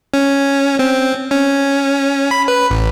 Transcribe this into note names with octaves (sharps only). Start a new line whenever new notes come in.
C#4
C4
C#4
B5
B4
A1